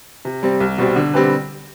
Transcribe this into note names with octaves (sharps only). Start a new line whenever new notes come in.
C3
G3 C4
C2
B2 G3 C4
D3
G3 C4 G4 B4